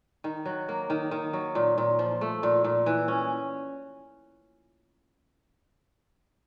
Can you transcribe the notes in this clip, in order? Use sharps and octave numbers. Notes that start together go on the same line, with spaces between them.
D#3
F#3
A#3
D#3
D#3
F#3
A#2
A#2
F3
A3
A#2
A#2
E3
C#4